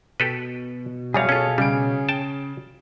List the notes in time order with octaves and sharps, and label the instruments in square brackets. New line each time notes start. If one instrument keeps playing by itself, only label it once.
[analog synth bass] B2 [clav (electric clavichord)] G4 A4 B4
[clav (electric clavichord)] F#2 G3 A#5 [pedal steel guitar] G#4 C#5 F5
[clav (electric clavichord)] C#4 F4 [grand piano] A4
[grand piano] C#3 D7 [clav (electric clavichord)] G3
[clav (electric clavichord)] G5 A5